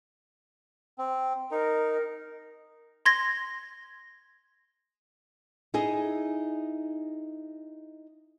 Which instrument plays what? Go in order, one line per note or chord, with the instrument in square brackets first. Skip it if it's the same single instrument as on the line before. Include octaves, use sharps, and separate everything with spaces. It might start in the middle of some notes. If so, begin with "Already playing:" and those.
[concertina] C4
[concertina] D#4 [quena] A#4
[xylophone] C6 G#6 A#6
[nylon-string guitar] D#4 E4 G#4 D#5